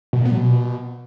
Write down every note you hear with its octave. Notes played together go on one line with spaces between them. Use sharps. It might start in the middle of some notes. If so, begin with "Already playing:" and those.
B2
A#2
B3
F#3
B2